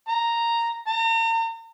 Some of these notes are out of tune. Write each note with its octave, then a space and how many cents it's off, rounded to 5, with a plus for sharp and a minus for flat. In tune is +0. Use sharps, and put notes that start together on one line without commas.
A#5 -5
A#5 -40